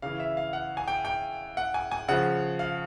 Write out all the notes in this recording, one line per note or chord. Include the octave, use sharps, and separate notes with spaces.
C#3 E3 F5
E5
F5
F#5
G#5
G5
G5
F#5
G#5
G#5
C#3 F3 F#5
F5